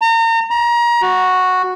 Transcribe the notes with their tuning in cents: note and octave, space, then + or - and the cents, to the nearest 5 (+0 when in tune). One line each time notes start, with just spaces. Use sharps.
A#5 -35
A#5 +30
F#4 -5